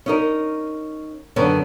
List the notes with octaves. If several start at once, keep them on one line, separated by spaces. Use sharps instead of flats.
C#4 D#4 A#4
F#2 D3 D#3 B3 C#4